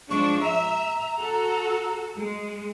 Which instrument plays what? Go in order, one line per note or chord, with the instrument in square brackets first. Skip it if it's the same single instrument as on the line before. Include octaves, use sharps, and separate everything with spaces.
[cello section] F3 G#3 D4 [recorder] C#6
[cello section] E5 [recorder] A#5
[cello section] F#4 A4
G#3